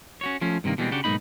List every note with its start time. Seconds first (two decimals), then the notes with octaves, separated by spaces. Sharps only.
0.21 C#4 F#4 C#5
0.41 F3 A3 C#4
0.64 G2 C3 D#3 A#3
0.78 B2 E3 G3 G#3 C4
0.91 C#3 D4 F#4 G4
1.04 B1 G#2 A#3 D#4 B5